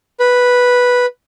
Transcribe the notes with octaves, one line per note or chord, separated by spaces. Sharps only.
B4